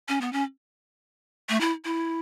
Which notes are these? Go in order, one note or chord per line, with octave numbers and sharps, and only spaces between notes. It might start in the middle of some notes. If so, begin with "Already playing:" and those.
C#4
B3
C#4
A3
E4
E4